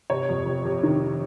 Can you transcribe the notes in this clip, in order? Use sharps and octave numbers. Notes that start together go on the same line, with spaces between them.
C3 C#5
F2
C3
C3
D#3